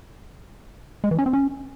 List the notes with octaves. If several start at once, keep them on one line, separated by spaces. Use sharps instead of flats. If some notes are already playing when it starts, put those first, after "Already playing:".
G#3
E3
C#4
C4
C#4